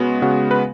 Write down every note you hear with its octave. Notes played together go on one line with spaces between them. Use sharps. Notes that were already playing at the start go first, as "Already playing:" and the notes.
Already playing: C#3 G#3 B3 F#4
C#3 F#4
B4